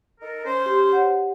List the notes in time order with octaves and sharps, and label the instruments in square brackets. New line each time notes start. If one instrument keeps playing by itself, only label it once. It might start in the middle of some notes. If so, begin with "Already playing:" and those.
[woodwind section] D#4 A4 A#4
C#4 C5
[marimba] G4
C#5 F#5